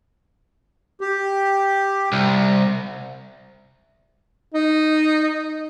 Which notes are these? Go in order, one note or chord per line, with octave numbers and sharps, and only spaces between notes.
G4
C2
D#4